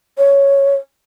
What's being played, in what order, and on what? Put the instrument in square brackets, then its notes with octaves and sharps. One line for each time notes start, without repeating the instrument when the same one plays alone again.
[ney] C#5